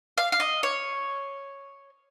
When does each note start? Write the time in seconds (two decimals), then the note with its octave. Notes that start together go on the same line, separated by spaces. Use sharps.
0.18 F5
0.32 F5
0.40 D#5
0.63 C#5